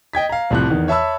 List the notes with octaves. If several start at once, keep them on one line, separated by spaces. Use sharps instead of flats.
D#5 G5 G#6 B6
F5 A#5
C2 A2 C3 F3 F#6
E2 D#3
C#5 E5 A5 B5 E6